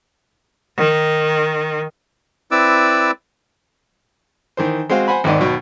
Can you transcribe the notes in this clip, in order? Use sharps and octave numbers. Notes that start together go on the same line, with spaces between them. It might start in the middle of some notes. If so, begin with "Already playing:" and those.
D#3
C4 E4 B4 D5 D6 E6
D#3 E3 C5
G#3 C4 F#4 C5 F5
C5 F#5 G#5 B5
G#1 D#2 G#2 D#3 D5 D#5
D#2 B2 F#3 C#6